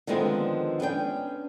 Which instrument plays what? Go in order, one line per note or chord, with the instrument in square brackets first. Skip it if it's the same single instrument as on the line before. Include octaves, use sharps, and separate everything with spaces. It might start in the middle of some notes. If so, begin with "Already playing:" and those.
[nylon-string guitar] D3 D#3 F3 G#3 B3 C4
B3 C#4 D4 G5